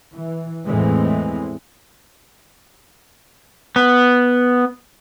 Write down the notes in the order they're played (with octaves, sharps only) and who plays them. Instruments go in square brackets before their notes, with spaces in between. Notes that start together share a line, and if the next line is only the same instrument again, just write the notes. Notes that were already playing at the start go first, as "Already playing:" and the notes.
[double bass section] E3
E2 A2 E3 G#3 C4
[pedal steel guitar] B3